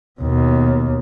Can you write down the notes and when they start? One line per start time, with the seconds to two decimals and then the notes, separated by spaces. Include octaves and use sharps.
0.20 D#2 B2